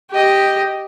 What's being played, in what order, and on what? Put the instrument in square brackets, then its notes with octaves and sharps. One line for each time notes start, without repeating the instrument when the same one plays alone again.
[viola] G4 D#5